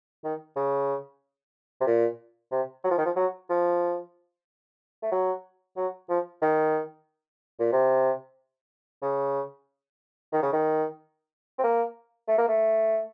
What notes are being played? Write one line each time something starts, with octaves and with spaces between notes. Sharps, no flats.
D#3
C#3
C3
A#2
C3
F#3
F3
D#3
F3
F#3
F3
A3
F#3
F#3
F3
D#3
A#2
C3
C#3
D#3
C#3
D#3
C4
A#3
A3
A#3
A3